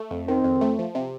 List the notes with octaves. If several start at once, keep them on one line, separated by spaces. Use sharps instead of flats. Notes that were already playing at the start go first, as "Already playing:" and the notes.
Already playing: A3
F2
D#3 C4
F2
A3
F3
C3